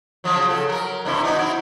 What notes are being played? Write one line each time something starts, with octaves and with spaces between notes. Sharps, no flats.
C#3 F3 F#3
C#3 A4
F#3 A4 A#4
G2 C3 E4
B3 D#4 F#4
C4 E4